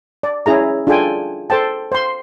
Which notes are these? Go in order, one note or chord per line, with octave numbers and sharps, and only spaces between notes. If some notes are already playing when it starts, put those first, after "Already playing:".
D5
C#4 E4 G#4 A#5
D4 F4 G#4 A4 G5 G#5
A4 C5 G5 A5
C5 C6